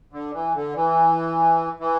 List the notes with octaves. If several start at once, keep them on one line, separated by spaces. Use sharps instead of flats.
D3
E3
D3
E3
E3